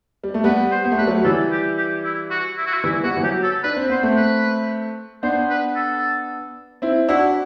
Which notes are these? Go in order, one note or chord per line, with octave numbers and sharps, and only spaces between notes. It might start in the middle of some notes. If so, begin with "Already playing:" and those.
G3
A3
G3 B3 B4
C5
B3
A3
G3 B4
F#3 A3
E3 G3 A4
G4
G4
E4
F#4
E4
F#4
E4
E3 G3 E4
G3 B3 F#4
E3
F#3 G4
A4
D4 B4
C4
B3 C5
A3 C4
B4
B3 D4 C5
B4
A4
C4 E4
D4 E4 F#4